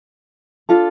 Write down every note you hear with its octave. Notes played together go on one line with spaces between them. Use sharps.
D4 F4 A4